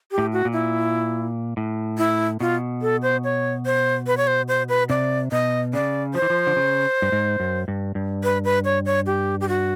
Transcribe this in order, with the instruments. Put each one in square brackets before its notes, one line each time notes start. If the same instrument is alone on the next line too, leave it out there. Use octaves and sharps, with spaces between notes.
[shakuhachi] G4
[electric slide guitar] A2
[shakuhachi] F#4
[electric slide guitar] A#2
[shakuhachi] E4
[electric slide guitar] A2
[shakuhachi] E4
[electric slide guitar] B2 [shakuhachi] F4
[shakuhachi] A4
C5
C#5
C5
B4
C#5
C5
C5
B4
[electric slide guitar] C3 [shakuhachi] D5
[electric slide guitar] B2 [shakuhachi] D#5
[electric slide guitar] C#3 [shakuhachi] D5
[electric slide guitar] F3 [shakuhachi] C5
[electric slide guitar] E3
F3
D3
C#3
G2
G#2
F#2
G2
G2
[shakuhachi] B4
B4
C#5
C#5
G4
G4
F#4